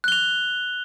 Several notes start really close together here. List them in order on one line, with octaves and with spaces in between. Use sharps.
F#6 G7 F7